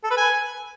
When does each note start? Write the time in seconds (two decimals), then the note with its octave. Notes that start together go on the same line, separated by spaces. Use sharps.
0.04 A4
0.10 B4
0.17 G#5